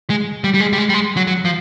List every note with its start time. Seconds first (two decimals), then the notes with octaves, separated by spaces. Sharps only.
0.10 G#3
0.44 G3
0.54 G3
0.60 G#3
0.73 G3
0.78 G#3
0.89 G3
0.94 G#3
1.17 F#3
1.27 F#3
1.45 F3